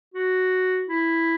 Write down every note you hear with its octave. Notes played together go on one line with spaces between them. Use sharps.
F#4
E4